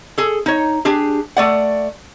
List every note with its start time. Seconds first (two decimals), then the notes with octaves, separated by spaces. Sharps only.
0.18 G#4 A4
0.46 D#4 C#5
0.85 D4 G4 G#4
1.37 A3 D5 F#5